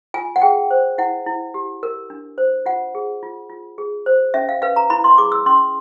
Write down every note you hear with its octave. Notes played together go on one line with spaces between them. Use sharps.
F4 G#5
F#5
G#4 G5
C5
E4 F#5
E4
G4
A#4
D4
C5
F4 F#5
G#4
F4
F4
G#4
C5
C#4 E5
F5
B4 F5
A#5
E4 B5
C6
G#4 D6
E6
C#4 C6